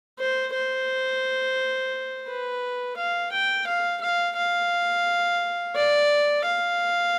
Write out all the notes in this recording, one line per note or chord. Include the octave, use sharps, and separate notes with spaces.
C5
C5
B4
F5
G5
F5
F5
F5
D5
F5